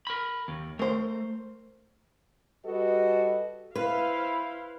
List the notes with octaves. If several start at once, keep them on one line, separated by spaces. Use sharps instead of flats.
A#4 B5
D#2
A3 A#4 C5
G3 F#4 A4 B4 D#5
E4 B4 C5 F5